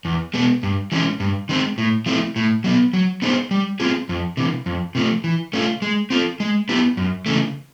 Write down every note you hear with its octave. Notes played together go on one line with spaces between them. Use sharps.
E2
B2 G#3 B3
G2
E3 G#3 C#4
G2
D#3 G#3 C4
A2
F3 A3 C4 E4
A2
F#3 B3
F#3
B3 D#4 G#4 C5
G3
C4 F4 G#4
F2
C3 E3
F2
C3 F3 A3
E3
A3 C#4 F4
G#3
C4 F4 A4
G#3
B3 E4 G4
F#2
C#3 E3 A3